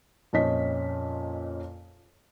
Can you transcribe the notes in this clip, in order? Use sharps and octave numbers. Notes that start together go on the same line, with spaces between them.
F2 A#2 C#4 D#5 B6